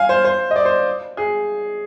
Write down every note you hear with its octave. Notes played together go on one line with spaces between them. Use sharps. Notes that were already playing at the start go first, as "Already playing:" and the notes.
Already playing: F5 G#5
C5
C5
D#5
D5
C5
G#4